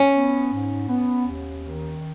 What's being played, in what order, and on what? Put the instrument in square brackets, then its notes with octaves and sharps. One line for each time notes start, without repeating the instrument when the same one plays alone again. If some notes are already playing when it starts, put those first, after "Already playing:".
Already playing: [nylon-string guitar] C#4
[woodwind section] B3
G#2
B3
D#2
D#3